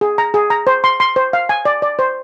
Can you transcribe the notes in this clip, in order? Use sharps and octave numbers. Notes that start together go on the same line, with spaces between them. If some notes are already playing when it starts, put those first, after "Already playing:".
G#4
A#5
G#4
A#5
C5
C6
C6
C5
F5
G#5
D5
D5
C5